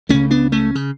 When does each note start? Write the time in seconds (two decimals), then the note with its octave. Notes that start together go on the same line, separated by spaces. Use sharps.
0.09 C#2 C#3 A3 C#4
0.31 B3 D4
0.52 A3 C#4
0.75 C#3